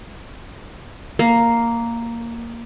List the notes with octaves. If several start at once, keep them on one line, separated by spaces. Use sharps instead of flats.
A#3